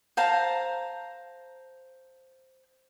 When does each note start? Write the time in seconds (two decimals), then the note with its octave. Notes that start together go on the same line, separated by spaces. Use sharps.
0.17 C5 F5 A5 A#5